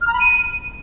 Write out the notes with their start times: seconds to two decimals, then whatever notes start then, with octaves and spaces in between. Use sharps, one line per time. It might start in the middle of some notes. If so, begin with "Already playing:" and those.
0.01 F6
0.07 A#5
0.14 B5
0.20 D#7